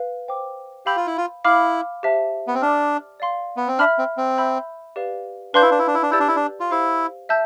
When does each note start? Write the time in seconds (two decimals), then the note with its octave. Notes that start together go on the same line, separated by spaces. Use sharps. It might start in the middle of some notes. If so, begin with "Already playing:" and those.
Already playing: B4 F5
0.28 C5 G5 D6
0.86 G4 F5 B5 E6 G6
0.96 F4
1.07 E4
1.17 F4
1.44 E4 F5 B5 D6 F6
2.03 G4 C5 E5 A5
2.47 B3
2.54 C4
2.62 D4 D5 A5 D6 F6
3.20 D5 F5 C6
3.57 B3
3.68 C4
3.79 D4 E5 B5 F6
3.98 C4
4.17 C4
4.38 E5 B5 E6 G6
4.96 G4 B4 D5 F5
5.54 D4 B4 F5 C6 G6
5.62 E4
5.71 D4
5.79 E4
5.87 D4
5.94 E4
6.03 D4
6.11 E4 G4 D5 A5 E6 G6
6.20 D4
6.28 E4
6.36 D4
6.60 F4
6.71 E4 G4 C5 F5
7.29 E5 A5 E6 G6